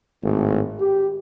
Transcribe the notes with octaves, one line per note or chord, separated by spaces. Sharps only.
G#1 A2
G4